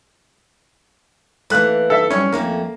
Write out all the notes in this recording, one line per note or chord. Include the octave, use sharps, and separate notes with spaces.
E3 A3 A#3 F#6
A4 E5
F#2 G3 C#4
F2 A3 A#3 C#4